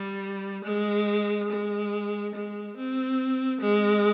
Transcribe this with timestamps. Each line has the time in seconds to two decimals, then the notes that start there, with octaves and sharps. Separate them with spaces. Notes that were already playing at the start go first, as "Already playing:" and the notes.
Already playing: G3
0.65 G#3
1.50 G#3
2.35 G#3
2.77 C4
3.61 G#3